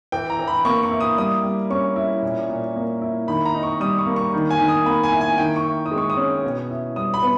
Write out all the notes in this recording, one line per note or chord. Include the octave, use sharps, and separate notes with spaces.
E3 G5
A#5
E3
B5
A#3 C#6
C#6
E4
D#6
G3 D#6
G3
C#4 C#6
E4
A#2
A#2
A#3
E4
D#3 B5
A#5
D#4
C#6
G3 D#6
C#6
A#3
C#6
D#3
G#5
D#3
D#6
A#3 B5
G#5
E4
G#5
D#3 G5
C#6
E4
D#6
G#3
C#6
D#6
C#4
B2
E4
G3 D#6
B5
B3